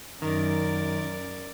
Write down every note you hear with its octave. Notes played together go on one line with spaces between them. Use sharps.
F#2 D#3 A#4 D5